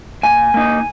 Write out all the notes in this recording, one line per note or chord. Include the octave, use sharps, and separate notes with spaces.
A#2 G#5
A#3 D#4